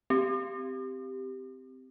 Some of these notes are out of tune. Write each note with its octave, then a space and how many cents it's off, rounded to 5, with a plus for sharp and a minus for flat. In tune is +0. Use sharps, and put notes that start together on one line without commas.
C4 -15 G4 +0